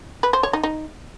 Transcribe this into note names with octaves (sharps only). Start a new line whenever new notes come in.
B4
C5
C#5
D#4
D#4